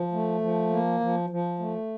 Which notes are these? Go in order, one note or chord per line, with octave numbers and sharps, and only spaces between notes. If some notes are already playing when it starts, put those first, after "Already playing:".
Already playing: F3
A3
F3
A#3
F3
F3
A3